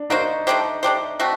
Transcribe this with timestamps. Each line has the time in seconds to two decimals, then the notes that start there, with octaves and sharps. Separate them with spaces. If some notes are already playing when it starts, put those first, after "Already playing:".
Already playing: D4
0.10 A#3 D#4 F#4 C5
0.47 A3 D4 G4 C5
0.83 A3 D4 G4 C5
1.20 A3 C4 F#4